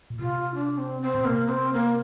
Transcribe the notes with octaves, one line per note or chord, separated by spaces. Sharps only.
A#2
C3 F4
D4
C4
C4
A#2
C3 A#3
C4
A#3